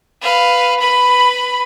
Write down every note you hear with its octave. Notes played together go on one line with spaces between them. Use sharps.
B4 F5
B4 B5